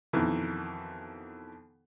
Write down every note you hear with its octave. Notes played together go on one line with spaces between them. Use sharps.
F2 B2 D#3 E3